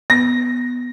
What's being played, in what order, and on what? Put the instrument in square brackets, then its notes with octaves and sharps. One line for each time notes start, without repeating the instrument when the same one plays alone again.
[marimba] B3 [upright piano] A#6